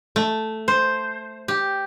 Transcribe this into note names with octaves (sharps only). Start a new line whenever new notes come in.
A3
C5
G4